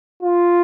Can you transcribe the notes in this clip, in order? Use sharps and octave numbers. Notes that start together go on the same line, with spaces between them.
F4